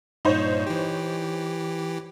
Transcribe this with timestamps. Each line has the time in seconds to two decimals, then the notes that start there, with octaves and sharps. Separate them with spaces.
0.25 G2 A#2 D#4 C5 C#5
0.67 E3 G4